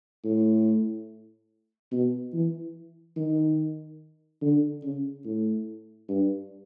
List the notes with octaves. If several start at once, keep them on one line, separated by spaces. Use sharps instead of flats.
A2
B2
E3
D#3
D3
C#3
A2
G2